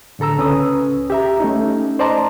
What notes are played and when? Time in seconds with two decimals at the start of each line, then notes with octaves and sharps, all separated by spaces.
0.19 A2 D3 A4 A#5 E6
0.38 C#2 C#4 B4 D#6
1.10 G4 E5 A#5
1.40 A3 C#4 D#4
1.99 C5 D5 D#5 A5 A#5 C6